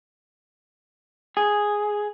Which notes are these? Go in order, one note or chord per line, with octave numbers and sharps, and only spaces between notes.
G#4